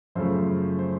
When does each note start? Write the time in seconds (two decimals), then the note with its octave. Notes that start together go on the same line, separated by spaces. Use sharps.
0.15 F#2 C#3 F3 A3 C5
0.79 C5